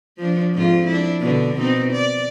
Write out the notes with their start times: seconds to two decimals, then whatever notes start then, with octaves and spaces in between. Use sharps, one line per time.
0.18 F3 D4
0.54 F2 G#2 F4
0.87 D4 E4
1.20 B2 D3 D4
1.57 B2 C4 D#4
1.92 D5